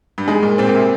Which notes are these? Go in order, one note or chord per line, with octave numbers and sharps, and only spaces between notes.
G2
G#2 G#3
A#2
A#2 C4
A#2
C3